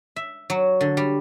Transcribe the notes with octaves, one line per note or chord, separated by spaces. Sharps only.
E5
F#3
D3
G3